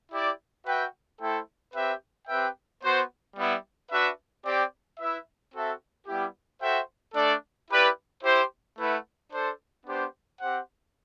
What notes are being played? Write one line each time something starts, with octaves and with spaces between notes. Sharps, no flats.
E4 G4 D5
F#4 B4 E5 G5
A3 E4 A4 C5 G5
C4 G4 B4 E5 G5
C4 G4 B4 E5 G5
B3 F#4 C5
G3 B3 E4
D4 F#4 B4 E5
C4 G4 D5 G5
E4 B4 E5
C4 F#4 A4 E5
G3 B3 E4 G4
F#4 A4 C5 E5 G5
A3 D4 A4 D5
E4 G4 B4 D5
E4 G4 C5
A3 E4 B4 F#5
D4 A4 C5
B3 D4 G4 C5
C4 G4 C5 F#5